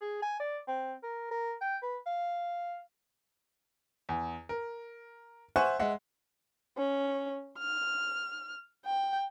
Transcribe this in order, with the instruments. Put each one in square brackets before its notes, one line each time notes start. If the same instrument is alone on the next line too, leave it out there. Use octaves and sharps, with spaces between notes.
[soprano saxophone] G#4
G#5
D5
C4
A#4
A#4
G5
B4
F5
[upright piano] E2
A#4
C5 E5 F#5 G#5 C#6 F#6
G#3 E5 F#5
[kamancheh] C#4
F6
G5